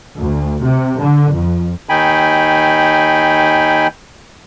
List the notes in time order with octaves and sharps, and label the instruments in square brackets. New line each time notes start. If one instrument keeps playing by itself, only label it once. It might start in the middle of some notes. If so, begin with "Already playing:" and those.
[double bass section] D2
C3
D3
F2
[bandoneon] D#2 D#3 D#4 G5 G#5 B5